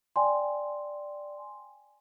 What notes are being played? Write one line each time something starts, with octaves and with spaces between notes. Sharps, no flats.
D5 G5 G#5 C6